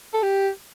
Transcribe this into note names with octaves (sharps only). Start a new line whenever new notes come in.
A4
G4